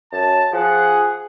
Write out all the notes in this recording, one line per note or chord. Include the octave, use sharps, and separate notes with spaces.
F#2 A5
F3 G#4 F#5